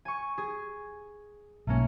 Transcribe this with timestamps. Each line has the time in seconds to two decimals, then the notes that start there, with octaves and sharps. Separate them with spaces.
0.05 G#5 C#6
0.38 G#4
1.67 B1 G#2 A3 A#3 C#4